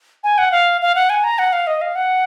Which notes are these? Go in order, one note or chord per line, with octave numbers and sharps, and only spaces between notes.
G#5
F#5
F5
F5
F#5
G#5
A#5
F#5
F5
D#5
F5
F#5